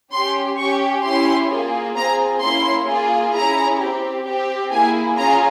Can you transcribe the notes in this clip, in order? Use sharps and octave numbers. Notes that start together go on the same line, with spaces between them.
C#4 G4 C6
C#4 G4 C#6
C#4 E4 G4 C6
A#3 F4 G#4
C4 F4 G#4 A#5
A#3 C#4 E4 C6
A#3 F4 G#4
C#4 E4 G#4 A#5
C4 G4
C4 G4
A#3 E4 G#4 G#5
C#4 F4 G#4 A#5